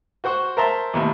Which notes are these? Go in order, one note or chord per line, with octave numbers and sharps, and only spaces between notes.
F#4 C5 F#5 C#6
A#4 C5 E5 A5 A#5 C6
A1 D#2 A2